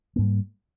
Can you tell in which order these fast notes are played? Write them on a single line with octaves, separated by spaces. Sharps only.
A#3 G#2 G3